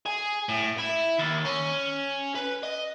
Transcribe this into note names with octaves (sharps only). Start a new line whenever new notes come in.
G#4
A2
E4
D#2
C#4
B4
D#5